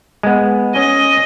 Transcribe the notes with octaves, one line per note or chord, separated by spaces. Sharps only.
G#3 B3
C#4 D#5